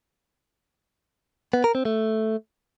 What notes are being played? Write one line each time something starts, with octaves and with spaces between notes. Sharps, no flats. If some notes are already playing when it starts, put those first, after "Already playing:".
B3
A#4
C4
A3